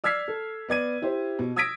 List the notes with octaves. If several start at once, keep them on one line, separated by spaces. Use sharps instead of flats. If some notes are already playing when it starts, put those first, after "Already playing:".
D5 E6 F6 G#6 B6 C7
A4
B3 D5 G#6 D#7
E4 G4 C5
B2
D#6 E6 G#6 A#6 B6 D7